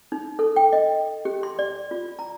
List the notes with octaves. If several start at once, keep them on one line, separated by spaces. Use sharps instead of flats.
D#4
A4
G5
D#5
G4
C6
D5
F4
A#5